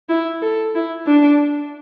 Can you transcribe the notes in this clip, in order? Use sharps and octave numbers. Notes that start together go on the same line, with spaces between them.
E4
A4
E4
D4